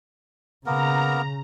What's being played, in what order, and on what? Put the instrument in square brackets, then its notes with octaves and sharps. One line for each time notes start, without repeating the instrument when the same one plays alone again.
[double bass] C#3 [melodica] A#3 B3 A#4 [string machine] A#5